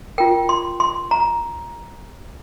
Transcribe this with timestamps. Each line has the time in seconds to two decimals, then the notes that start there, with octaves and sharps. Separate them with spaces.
0.18 F4 A#4 G5
0.49 C6
0.80 C6
1.11 A#5